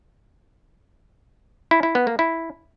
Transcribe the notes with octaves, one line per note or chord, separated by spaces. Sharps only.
E4
E4
B3
A#3
E4